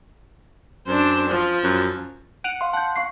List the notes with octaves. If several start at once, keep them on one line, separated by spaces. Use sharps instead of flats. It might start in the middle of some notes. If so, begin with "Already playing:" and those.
F#2 D4 C5
F3
F#2
F#5 D7 D#7 F7
F5 C6
F#5 A5 G6
F5 C#6 C7